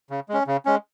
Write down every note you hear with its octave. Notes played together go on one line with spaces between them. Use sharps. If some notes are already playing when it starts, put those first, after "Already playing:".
C#3
G#3 C#4
C#3
G#3 C#4